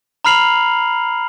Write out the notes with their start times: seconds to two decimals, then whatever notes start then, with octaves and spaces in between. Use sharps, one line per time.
0.25 A#5 B5 F6 C7 F7 F#7